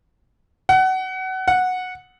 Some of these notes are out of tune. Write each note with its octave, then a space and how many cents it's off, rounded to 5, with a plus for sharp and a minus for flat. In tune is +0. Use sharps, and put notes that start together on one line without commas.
F#5 +25
F#5 -10